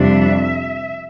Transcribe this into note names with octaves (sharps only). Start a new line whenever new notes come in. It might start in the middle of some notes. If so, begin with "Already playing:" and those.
Already playing: F2 C3 G3 D4 E5